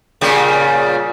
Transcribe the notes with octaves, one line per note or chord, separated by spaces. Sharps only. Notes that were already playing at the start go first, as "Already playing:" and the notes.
A#2 C#3 G3